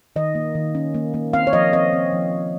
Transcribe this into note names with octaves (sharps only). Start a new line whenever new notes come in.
D#3 D#5
A#3
D#3
C#4
A#3
A#3
C4 F5
C#5
F3 D#5
C4 D#5
C4
F3
C4